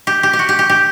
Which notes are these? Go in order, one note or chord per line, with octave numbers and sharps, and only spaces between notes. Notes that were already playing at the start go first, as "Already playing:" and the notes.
G4
G4
G4
F#4
G4
G4
G4